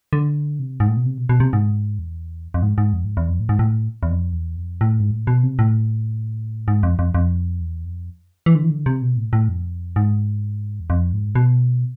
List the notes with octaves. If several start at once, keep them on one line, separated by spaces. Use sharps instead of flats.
D3
C3
G#2
A2
B2
C3
B2
B2
C3
G#2
E2
F2
G#2
G#2
F2
G#2
E2
F2
A2
G#2
A2
E2
F2
E2
F2
A2
G#2
A2
B2
C3
A2
G#2
F2
F2
F2
E2
F2
E3
D3
E3
D3
C3
B2
A2
A2
F2
G#2
E2
F2
G#2
B2